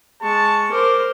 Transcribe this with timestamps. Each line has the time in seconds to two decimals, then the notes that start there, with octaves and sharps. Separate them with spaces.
0.22 G#3 A5 C#6
0.72 A#4 C5 D6